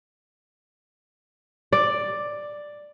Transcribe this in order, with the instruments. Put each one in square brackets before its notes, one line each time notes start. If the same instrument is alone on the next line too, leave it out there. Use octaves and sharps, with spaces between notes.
[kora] D5